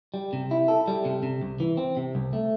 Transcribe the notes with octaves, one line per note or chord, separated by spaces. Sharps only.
G3
C3
E4
A4
G3
C3
C3
C2
E3
C4
C3
C2
A3